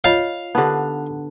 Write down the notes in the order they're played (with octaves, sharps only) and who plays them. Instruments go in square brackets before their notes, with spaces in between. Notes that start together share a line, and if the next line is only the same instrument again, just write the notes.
[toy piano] F4 C#5 D#5 [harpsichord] F5
[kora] D3 B3 [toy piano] D#4 G4